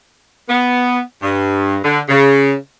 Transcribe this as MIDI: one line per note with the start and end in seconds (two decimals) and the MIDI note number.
0.49 1.00 59
1.22 1.77 43
1.83 2.00 50
2.09 2.53 49